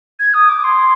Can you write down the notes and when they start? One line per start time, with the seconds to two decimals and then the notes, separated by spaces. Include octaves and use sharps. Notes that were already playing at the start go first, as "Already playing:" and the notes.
0.19 G#6
0.33 D#6
0.49 D6
0.64 C6